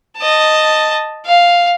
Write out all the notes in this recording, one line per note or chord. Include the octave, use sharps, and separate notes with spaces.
D#5 A5
F5